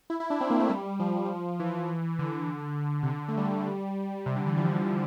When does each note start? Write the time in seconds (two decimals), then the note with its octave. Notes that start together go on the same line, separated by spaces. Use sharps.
0.10 E4
0.20 E4
0.30 D4
0.41 C4
0.50 A#3
0.60 A3
0.69 G3
1.00 F3
1.60 E3
2.19 D3
3.03 C3
3.08 D3
3.28 A3
3.37 G3
4.26 C3
4.36 D3
4.47 E3
4.57 F3